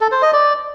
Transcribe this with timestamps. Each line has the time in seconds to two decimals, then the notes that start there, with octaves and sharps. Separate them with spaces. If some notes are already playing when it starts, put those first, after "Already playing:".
0.01 A4
0.12 C5
0.22 D#5
0.33 D5